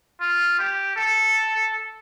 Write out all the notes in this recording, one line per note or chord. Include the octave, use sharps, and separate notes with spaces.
F4
G4
A4